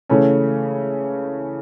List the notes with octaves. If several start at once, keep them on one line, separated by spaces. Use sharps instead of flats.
C#3 E3 A3 C#4